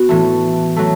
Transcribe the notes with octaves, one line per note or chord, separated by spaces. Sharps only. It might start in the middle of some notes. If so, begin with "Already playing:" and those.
Already playing: B3 F#4
A2 E3 A3
F#3 A3